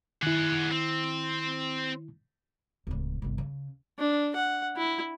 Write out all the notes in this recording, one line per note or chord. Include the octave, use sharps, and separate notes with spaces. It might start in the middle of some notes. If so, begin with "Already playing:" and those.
D#3 E4 G#4 F#5
C4
D1 C#2
G1 C2
C#3
D4
F#5
E4